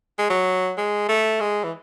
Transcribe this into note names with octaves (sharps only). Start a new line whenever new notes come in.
G#3
F#3
G#3
A3
G#3
E3